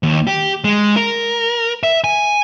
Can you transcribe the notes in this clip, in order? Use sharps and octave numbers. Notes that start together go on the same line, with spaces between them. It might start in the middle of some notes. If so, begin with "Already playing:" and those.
D#2
G4
G#3
A#4
E5
G#5